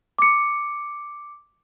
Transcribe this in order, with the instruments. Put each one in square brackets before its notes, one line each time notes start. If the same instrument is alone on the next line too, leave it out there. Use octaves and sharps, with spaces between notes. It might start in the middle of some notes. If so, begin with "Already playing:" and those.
[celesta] D6 C#7